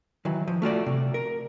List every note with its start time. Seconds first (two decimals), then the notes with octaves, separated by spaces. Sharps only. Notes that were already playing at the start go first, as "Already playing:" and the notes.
0.25 D#3 E3 F#3
0.48 F3
0.62 A3 F4 F#4 D5
0.86 C3
1.14 A#4